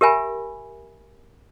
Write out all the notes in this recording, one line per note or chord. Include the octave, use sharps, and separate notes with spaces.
G4 A#4 E5 G#5 B5